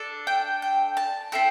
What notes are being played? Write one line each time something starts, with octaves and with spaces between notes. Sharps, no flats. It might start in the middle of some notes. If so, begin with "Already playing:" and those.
Already playing: D4 A4
G5
G5
A5
C4 E4 A4 G5